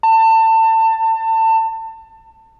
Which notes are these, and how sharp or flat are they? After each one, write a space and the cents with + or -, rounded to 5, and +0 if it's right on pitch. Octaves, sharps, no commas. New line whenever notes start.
A5 +30